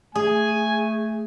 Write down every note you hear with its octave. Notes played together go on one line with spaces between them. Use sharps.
A3 G#4 G#5